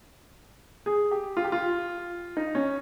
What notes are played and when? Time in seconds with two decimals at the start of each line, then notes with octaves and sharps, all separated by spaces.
0.86 G#4
1.11 G4
1.37 F4
1.44 G4
1.52 F4
2.37 D#4
2.55 C#4